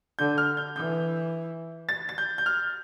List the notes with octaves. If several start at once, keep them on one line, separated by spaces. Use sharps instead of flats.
D3 G6
F6
G6
E3 G6
A6
A6
G6
G6
F6